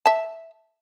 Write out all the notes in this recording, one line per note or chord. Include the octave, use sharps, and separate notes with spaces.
E5 A5